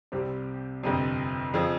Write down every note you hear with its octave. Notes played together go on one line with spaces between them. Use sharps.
C2 C3 G3 C4 G4
G1 F2 C3
F2 C#3 F3